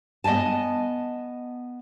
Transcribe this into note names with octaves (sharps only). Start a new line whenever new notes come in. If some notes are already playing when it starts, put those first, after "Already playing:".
B3 D#5 E5 G#5 A5